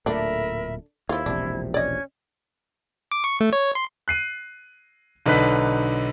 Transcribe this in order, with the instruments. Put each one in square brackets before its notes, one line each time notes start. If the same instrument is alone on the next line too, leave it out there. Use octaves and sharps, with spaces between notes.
[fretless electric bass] D1 A#2 A3 [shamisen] D3 D4 [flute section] A#4 E5 B5
[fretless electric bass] D#2 [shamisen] F3 F4 [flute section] E4 G#6
[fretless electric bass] E1 A#1 C3 [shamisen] D4
[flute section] C#4 G#6 [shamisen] D5 D#5
[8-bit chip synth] D6
C#6
A3
C#5
C6
[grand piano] F#6 C7 D#7
B1 D3 D#4 B4 F#6 B6